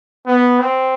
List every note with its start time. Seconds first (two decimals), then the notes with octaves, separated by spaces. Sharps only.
0.27 B3
0.59 C4